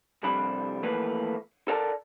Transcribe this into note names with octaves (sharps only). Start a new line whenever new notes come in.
C2 F2 G3 C4 D4 B5
E3 F3 A3 A#3 B4
A4 A#4 D5 A5